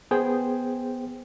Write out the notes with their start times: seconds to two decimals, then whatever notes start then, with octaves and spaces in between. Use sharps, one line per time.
0.11 B3 G#4 C5 G5